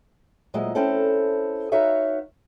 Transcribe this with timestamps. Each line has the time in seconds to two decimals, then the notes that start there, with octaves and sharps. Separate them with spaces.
0.54 A#2 F#3 G#3 E4 C5 D#5
0.75 C4 C#4 E4 A4
1.72 D#4 F#4 B4 C#5 E5 F5